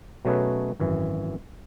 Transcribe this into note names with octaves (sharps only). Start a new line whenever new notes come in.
B2 F#3 A3 C#4 G#4 B4
G#1 F#2 E3